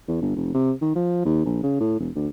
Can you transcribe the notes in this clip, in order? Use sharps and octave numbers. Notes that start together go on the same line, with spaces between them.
E2
G1
F1
C3
D#3
F3
D#2
A#1
C#3
A2
E1
D2